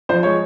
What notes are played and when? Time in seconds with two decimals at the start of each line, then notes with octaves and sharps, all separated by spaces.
0.09 F3 C5
0.23 G#3 C#5